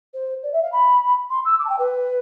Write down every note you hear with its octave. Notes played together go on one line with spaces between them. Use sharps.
C5
D5
E5
F5
B5
C6
E6
D6
A5
G5
B4